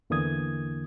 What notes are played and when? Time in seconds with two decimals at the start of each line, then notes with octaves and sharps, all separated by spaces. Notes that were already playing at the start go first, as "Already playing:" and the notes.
0.10 E2 D3 E3 A#3 D#6 G#6